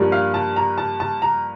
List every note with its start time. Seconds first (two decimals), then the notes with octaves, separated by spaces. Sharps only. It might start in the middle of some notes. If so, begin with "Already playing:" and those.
Already playing: G2 F3 A#3 D4
0.12 F5
0.34 A5
0.56 A#5
0.78 A5
1.00 A5
1.22 A#5